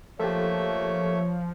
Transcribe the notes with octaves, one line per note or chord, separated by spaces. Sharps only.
F3 A3 A#3 G4 A4 C#5 E5